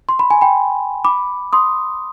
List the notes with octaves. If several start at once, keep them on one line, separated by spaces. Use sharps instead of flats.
C6
B5
G#5
G5 B5
B5 D6
C6 D#6